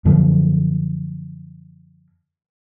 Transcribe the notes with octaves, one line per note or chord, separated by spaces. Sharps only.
F#2 D3 F3 A#3